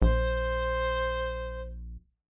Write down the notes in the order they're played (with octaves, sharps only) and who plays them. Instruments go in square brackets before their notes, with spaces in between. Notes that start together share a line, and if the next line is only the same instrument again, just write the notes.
[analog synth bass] A#1 [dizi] C5